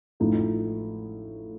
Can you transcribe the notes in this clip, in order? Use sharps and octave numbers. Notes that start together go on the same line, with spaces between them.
A1 A2 F3 A3 D#4